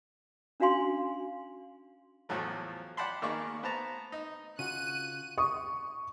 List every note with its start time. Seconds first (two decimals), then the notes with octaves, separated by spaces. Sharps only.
0.60 C#4 D4 F#4 F5 G#5 C6
2.29 E2 A2 F3 F#3 A3
2.97 D5 F#5 G5 A5 B5 C6
3.22 D#3 A#3 B3 G#4 D5 C#6
3.63 B3 C5 A5 A#5
4.12 D#4
4.59 C#3 F4 F#4 F#6 D#7
5.38 C#6 D#6